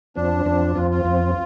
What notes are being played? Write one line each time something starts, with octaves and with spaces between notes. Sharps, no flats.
F2 F3 C4 D4
F2 F3 C4
F2 F3 C4 F4
F4
F2 F3 C4